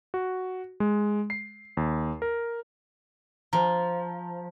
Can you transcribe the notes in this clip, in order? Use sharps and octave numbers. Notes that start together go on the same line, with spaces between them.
F#4
G#3
C7
D#2
A#4
F3 C5 A#5